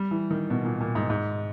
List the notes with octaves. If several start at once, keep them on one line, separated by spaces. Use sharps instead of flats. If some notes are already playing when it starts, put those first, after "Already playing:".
Already playing: G3
E3
D#3
B2
A#2
A#2
G#2
G#2